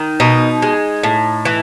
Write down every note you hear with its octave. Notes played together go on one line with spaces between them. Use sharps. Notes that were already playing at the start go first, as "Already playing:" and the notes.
Already playing: D#3
B2 D#4
G#3
A2
E3